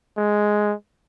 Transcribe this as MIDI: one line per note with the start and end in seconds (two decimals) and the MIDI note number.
0.18 0.74 56